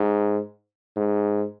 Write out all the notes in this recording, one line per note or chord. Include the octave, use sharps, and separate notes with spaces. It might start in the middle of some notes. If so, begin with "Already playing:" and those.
Already playing: G#2
G#2